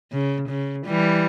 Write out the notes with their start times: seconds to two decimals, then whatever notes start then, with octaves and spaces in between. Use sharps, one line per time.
0.12 C#3
0.49 C#3
0.87 E3 G3